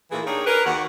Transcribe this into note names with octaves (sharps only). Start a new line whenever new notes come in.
A#2 E3 A3 E4 F4 G#4
D4 D#4 G4 G#4 A#4 C#5
G#4 A#4 B4
D#2 F#4 F#5